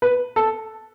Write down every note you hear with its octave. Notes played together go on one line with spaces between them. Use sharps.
B4
A4